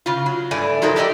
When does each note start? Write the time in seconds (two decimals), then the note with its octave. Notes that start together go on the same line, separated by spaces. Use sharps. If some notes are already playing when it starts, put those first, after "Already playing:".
0.06 C#3 F4
0.26 F#3
0.51 G2 A3 D5 G#5
0.82 F3 F#3 D#4 A4 A#4
0.96 G4 A4 D5 D#5 G5